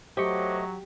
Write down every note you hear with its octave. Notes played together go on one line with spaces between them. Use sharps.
F#3 A3 G4 C5 D#5 D6 C#7